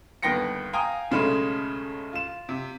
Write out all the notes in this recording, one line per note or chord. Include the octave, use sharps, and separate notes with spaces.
G1 D#2 B3 G5 A#6 C#7
F5 G5 G#5 A#5 D#6
B1 C#3 G#3 A3 B5
F4 E7
C3